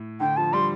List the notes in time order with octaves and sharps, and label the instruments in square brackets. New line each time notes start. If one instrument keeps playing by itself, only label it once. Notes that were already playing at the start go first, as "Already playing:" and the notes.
Already playing: [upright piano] A2
[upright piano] D3 [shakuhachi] G5
[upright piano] F3 [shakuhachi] A5
[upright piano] G3 [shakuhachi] C6